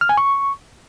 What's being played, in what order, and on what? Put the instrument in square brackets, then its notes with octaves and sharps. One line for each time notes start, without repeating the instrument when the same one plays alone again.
[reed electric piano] F6
G#5
C#6